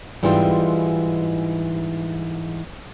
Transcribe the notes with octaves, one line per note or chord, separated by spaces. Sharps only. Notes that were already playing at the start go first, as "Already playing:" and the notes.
G#2 E3 G3 G#3 C4 F4